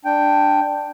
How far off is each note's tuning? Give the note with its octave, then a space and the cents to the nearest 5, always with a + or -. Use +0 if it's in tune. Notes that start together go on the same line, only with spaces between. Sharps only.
D4 +5 G5 +0